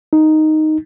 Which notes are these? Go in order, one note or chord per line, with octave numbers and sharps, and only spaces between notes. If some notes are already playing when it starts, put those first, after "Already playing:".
D#4